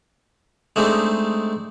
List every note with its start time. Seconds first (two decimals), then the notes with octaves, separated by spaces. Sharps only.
0.76 G#3 A3 C4 D4 D#4